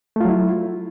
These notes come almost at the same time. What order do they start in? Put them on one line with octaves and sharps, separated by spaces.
A3 F4 F#3 E4